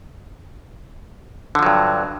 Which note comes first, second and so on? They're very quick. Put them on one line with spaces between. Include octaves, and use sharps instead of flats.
D3 F3 F#3 G2